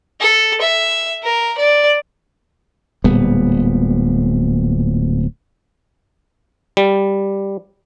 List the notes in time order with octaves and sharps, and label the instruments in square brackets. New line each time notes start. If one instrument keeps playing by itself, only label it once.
[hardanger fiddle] A4
E5
A#4
D5
[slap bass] D1 A#2 G3 B3
[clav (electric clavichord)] G3